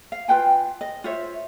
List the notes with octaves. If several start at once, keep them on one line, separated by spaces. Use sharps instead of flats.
F5
F4 B4 G5 G#5
D#5
F4 C5 C#5 E5